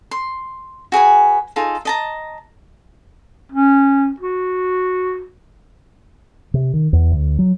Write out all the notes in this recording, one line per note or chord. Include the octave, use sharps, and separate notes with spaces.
C6
F#4 G#4 B4 G#5
D#4 F4 G#4 A4
D#5 A5 A#5
C#4
F#4
C3
D#3
E2
D2
F#3